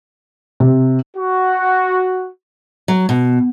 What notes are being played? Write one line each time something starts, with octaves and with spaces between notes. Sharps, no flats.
C3
F#4
F#3
B2